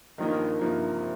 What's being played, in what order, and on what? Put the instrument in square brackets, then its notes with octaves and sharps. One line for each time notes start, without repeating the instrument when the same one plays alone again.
[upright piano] G2 F3 A#3 D#4 [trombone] D#3
[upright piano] G2 F3 A#3 D#4 [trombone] C3